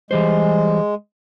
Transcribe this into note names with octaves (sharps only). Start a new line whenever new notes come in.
E3 G3 G#3 C5